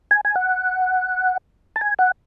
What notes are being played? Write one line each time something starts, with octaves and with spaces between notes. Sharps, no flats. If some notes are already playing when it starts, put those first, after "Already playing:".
G#5
G#5
F#5
A5
G#5
F#5